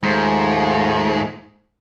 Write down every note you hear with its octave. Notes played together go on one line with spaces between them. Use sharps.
D#2 G#2 F3 A3